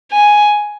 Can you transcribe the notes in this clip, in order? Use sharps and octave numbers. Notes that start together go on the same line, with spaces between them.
G#5